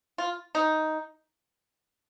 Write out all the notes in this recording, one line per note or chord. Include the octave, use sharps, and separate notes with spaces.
F4
D#4